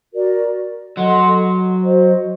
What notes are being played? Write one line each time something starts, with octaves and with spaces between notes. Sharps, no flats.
F#4 A#4 D5
F#3 A4 D#5 F#5 C6
F#4 C5 D#5